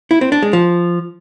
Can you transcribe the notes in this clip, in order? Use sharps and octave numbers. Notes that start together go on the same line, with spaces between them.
E4
C4
D4
G#3
F3